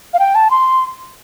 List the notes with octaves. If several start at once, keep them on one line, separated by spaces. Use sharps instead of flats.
F5
G5
A5
C6